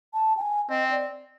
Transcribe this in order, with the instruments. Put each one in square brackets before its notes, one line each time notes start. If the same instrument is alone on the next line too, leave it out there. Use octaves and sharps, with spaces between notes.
[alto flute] A5
G5
G#5
[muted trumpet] C4 [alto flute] D#5
[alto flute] D5